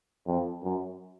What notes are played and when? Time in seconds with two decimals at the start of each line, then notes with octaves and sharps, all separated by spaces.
0.27 F2
0.63 F#2